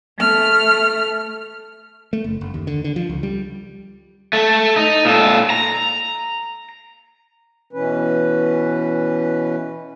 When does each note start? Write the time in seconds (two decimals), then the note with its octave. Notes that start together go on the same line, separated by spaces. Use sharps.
0.18 A3 F6
2.13 A3
2.24 F#1
2.41 F#1
2.54 D#2
2.67 D3
2.84 D3
2.96 F3
3.09 C#2
3.23 G3
4.33 A3
4.76 D#4
5.05 A#2 A4
5.50 A#5
7.73 B2 E3 C#4 B4